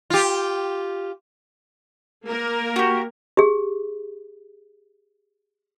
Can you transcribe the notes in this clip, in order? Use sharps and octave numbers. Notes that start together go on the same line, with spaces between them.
F4 G4
A#3 A#4
F#4 G4
G4 G#4